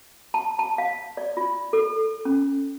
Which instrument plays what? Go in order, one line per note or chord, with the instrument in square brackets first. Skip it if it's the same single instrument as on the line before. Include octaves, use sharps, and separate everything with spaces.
[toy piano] A5
A5
F5
D5
F4
A4
C#4